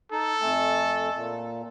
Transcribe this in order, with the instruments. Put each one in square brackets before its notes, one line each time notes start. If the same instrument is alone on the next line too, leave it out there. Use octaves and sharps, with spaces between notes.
[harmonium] D#4 [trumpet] A4
[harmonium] F2 A3 G#5
A#2